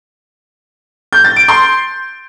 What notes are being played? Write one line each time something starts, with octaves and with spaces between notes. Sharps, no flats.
G6
A6
D7
C6